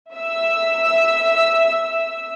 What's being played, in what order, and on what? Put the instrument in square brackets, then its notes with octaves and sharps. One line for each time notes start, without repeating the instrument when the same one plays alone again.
[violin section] E5 E6